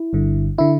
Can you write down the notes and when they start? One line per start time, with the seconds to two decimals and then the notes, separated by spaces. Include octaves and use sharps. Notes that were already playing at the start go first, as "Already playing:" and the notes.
Already playing: E4
0.13 G1 G2 D3
0.58 D3 E4